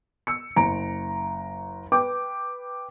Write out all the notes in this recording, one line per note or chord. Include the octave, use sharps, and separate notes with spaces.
E6 C#7
F#1 A#5 D7
B4 G5 D6